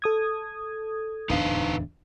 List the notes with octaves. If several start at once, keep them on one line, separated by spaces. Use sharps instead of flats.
A4 D#6 G#6
D1 E2 D4 D#4 B4 F5